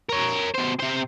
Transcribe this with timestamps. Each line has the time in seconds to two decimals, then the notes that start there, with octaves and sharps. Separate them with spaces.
0.09 A#4 C#5
0.55 B2 C5
0.80 C3 C5